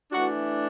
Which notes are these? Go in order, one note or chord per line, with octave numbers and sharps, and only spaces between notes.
E3 A3 D4 F#4